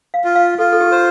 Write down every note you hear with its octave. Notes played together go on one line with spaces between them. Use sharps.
F5
F4
F5
F4 A4
A4
G4
C5